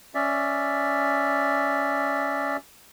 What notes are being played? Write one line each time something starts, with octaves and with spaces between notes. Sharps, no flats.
C#4 D5 E5